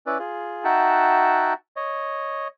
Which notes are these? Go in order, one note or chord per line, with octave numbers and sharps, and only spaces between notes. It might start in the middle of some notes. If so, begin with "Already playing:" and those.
C#4 E4 B4 D5
F4 G#4
D#4 F#4 E5 F#5 G5 A5
C#5 D#5